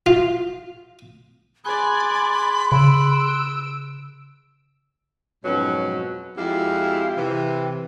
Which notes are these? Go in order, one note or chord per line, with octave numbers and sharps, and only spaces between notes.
F4
G#4 D5 G#5 B5 C6 F#6
C#3 E6 D7
F2 G#2 B2 F#3 C#4
F2 G#3 E4 F#4 G4 F5
C3 E3